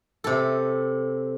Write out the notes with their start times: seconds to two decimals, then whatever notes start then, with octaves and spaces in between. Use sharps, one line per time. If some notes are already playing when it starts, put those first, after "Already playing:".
0.24 C3 A4